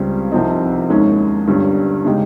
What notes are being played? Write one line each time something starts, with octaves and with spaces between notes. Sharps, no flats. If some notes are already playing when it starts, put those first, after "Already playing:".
Already playing: C#2 C#3 G3 C4
C2 C3 F3 C4 D#4
D#2 D#3 G#3 C#4
G1 G2 G3 C#4
C#3 G#3 D#4 G4